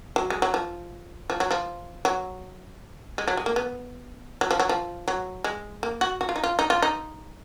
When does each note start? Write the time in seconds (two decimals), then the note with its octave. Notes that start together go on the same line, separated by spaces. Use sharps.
0.16 F#3
0.30 G#3
0.42 F#3
0.54 F3
1.30 F3
1.40 F#3
1.51 F3
2.05 F#3
3.18 G#3
3.28 F#3
3.37 G#3
3.46 A#3
3.56 B3
4.41 F#3
4.51 F3
4.60 F#3
4.69 F3
5.08 F#3
5.44 G#3
5.83 A#3
6.01 F#4
6.21 F#4
6.29 F4
6.36 D#4
6.44 F4
6.59 D#4
6.70 F4
6.82 D#4